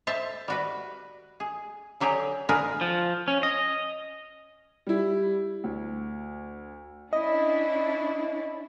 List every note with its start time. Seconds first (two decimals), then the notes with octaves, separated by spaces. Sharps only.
0.07 C5 E5 A5
0.48 G3 F#4 B4
1.40 G#4
2.00 D3 F#3 G4 G#4 A#5
2.49 D3 C4 G#4 A#4 B4 F5
2.81 F3
3.28 C#4
3.43 D#5
4.87 G3 E4
5.64 D2
7.13 C#4 D4 E4 D#5